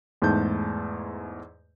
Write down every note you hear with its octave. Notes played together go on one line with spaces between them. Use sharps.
E2 G#2 A3 A5 G6